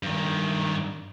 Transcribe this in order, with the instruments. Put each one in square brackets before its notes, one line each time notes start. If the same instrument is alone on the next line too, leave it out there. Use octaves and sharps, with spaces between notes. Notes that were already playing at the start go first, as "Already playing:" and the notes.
[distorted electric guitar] G2 D#3